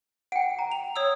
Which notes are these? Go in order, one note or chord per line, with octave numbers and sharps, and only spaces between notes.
F#5 G5 D7
A#5
F7
C#5 D#6 E6